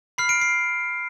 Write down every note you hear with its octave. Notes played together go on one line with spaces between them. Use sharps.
B5 F6 C7
D7
C7